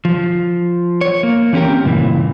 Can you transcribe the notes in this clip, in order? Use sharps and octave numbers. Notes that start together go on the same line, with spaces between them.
F3
C#5
A#3
E3 C4 C#4 G4 A#4
C#2 G2 A#2 E3